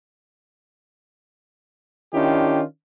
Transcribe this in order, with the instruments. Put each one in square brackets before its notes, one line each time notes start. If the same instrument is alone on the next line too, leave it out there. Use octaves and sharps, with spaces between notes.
[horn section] D#3 C#4 D4 E4 F4 G4